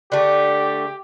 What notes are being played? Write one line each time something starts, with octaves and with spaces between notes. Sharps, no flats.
D3 A3 G4